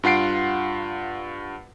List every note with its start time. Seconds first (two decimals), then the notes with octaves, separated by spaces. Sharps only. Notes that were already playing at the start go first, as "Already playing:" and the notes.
0.03 G2 F4 F#5 C7 D7